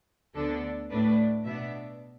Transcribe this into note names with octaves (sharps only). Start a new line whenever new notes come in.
D2 D3 B3 D4 A4
A2 A3 D4 B4
B2 B3 D4 E5